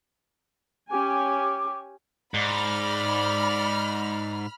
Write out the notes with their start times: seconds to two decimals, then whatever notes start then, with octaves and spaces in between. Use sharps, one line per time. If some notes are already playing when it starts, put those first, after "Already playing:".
0.91 C#4 G4 G#5 D6
2.34 G#2 D5 B5 F6